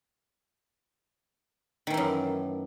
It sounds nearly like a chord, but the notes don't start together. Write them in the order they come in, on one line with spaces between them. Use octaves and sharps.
D#3 E3 A3 F#2